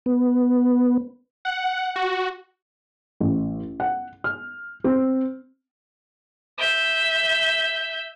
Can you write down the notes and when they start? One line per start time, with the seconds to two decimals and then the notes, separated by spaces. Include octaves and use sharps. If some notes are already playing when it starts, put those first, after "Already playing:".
0.06 B3
1.45 F#5
1.96 F#4
3.20 A1
3.80 F#5
4.24 F6
4.84 C4
6.58 E5 G6